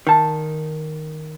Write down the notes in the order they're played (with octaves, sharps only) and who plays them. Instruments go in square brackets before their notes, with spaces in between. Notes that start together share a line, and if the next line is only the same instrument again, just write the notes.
[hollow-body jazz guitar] D#3 A5